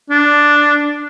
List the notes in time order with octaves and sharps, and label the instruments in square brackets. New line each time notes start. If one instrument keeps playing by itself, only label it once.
[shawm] D4